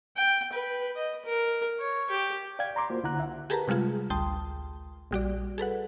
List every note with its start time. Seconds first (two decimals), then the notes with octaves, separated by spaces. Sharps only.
0.17 G5
0.52 B4
0.96 D#5
1.25 A#4
1.80 C#5
2.10 G4
2.59 D5 F5 G5 G#6
2.75 D5 A#5 C6 D6
2.90 A#3 F4 F#4 A#4 C5
3.03 C2 D3 E4 F#5 A#5 F#6
3.19 E5 F#5
3.50 G4 G#4 A#4 B4 A5 A#5
3.68 C3 G3 G#3 F4 G#4
4.10 A1 D2 G5 A5 C6 D#6
5.11 A#1 G3 F#4 D5
5.58 G#4 A4 B4 F#5